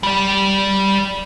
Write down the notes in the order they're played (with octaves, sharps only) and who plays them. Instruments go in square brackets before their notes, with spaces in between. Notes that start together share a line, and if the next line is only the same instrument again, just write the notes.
[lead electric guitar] G3 D5